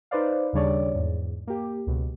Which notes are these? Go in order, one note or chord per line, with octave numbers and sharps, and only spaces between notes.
D#4 B4 C5 D5 F5
D#2 C#3 G3 D4 C#5 D5
E2 G#2
A#3 G4
C#2 B2